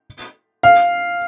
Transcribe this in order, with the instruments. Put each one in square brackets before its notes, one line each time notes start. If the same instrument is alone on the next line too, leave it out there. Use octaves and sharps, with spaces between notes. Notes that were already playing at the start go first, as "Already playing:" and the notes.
[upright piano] F5